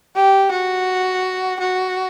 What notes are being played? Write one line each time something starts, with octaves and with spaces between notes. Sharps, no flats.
G4
F#4
F#4